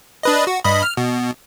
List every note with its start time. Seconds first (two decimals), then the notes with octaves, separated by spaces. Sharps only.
0.23 D4 B4 D#5
0.47 F#4
0.64 G2 D#5 B5
0.83 F6
0.97 B2